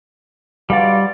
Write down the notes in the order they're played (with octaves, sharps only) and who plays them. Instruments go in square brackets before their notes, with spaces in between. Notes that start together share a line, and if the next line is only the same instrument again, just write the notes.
[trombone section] B1 F4 F#4 [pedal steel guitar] G3 D5